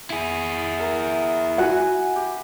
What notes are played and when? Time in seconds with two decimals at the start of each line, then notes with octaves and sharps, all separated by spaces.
0.10 E4 G#4
0.79 A#4 E5
1.58 F#4 B4 F#5 G#5 B5
2.16 G4